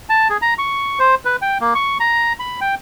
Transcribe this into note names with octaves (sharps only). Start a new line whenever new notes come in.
A5
G#4
A#5
C#6
C5
B4
G5
A#3
C#6
A#5
B5
G5